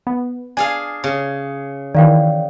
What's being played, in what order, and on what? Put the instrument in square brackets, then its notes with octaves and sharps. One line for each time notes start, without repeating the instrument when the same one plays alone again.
[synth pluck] B3
[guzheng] D4 G#4 F5 [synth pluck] G#5
[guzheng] C#3
[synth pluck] D#3 E3 [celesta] D5 F5 G5